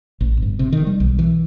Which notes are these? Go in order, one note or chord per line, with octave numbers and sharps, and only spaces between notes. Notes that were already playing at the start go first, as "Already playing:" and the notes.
A1
G1
C3
D#3
G3
B1
E3